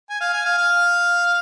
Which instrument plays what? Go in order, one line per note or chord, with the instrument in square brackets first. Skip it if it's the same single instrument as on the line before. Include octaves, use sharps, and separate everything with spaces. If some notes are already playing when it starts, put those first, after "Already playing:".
[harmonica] G#5
F5
G#5
F5
F5